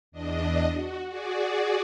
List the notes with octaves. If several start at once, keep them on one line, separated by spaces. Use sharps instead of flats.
E2 D4 D#5
F#4
F#4 G#4 D5